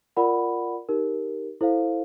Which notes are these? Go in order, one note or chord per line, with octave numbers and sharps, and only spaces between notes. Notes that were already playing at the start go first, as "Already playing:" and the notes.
F4 A#4 D5 F#5 B5
D#4 G4 A#4
E4 A4 C5 F5